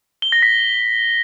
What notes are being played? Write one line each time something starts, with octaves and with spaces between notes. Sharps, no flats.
G7
A#6
B6